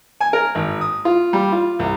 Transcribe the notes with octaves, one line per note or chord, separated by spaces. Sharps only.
G#5
A#4
G#1
D#6
F4
G3
F4
C2